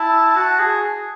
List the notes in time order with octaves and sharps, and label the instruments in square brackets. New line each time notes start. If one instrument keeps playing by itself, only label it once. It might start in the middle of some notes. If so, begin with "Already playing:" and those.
Already playing: [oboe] E4 [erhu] A5
[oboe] F#4
G#4